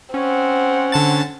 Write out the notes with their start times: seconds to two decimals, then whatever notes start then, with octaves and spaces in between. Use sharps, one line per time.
0.14 C4 C#4 F#5
0.92 D3 A5 A6